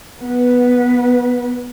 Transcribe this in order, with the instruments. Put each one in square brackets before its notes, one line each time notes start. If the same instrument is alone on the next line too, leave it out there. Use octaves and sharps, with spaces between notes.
[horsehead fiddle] B3 B4